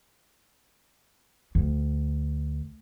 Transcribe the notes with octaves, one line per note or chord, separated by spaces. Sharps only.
D2